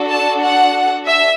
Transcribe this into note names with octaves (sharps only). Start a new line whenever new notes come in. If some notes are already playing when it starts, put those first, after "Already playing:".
Already playing: D4 F#4 A4
A5
F#5
E5